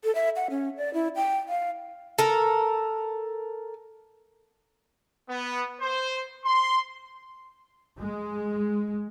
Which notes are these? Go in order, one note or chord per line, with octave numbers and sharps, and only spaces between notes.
A4
E5
F#5
C#4
D5
E4
G5
F5
A4 A#4
B3
C5
C6
G#3